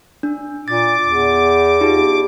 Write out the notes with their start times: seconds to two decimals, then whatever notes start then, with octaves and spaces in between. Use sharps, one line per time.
0.23 D4
0.68 A#2 D6 A6
1.06 E2
1.81 D#4 F4 G4